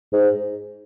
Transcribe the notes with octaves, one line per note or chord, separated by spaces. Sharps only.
G#2